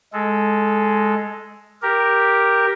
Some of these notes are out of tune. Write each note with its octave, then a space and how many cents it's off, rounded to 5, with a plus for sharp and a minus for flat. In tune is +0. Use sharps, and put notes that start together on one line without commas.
G#3 +5 A4 -10
G4 +0 A#4 +0